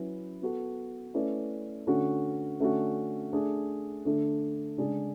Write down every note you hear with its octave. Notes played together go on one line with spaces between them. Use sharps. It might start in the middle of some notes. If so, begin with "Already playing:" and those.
Already playing: F#3 C#4 E4 B4
B3 F#4 A4
A3 C#4 E4 B4 D5
D3 A3 C#4 F#4
D3 A3 C#4 F#4
A3 D4 G#4
D3 A3 D4
C#3 G#3 D4 G#4 D5